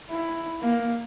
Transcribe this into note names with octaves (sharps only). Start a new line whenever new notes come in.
E4
A#3